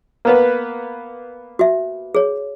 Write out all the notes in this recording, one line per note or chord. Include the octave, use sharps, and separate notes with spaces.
A#3 B3 B4
F#4 E5
G#4 C#5